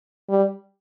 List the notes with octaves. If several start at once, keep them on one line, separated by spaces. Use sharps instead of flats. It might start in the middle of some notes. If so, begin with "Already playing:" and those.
G3